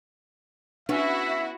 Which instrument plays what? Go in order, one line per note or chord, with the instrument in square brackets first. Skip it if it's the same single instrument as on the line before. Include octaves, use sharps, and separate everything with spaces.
[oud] B3 C#4 [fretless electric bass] D4 [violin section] E4 F#4 [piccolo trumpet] E5